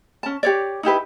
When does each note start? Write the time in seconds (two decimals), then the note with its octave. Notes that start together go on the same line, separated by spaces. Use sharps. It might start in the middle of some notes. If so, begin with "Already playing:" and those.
0.23 C#4 A5
0.43 G4 C#5 D5
0.83 D#4 E4 G4 B4